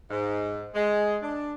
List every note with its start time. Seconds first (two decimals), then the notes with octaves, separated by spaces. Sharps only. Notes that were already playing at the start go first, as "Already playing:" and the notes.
0.10 G#2
0.75 G#3
1.22 D4